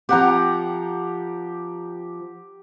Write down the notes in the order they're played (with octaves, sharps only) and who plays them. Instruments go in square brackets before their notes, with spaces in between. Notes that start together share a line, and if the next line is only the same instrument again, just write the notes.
[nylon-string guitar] F3 C4 [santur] G4 F#5 A#5